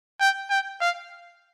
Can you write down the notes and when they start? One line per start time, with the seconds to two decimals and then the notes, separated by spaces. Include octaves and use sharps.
0.20 G5
0.50 G5
0.81 F5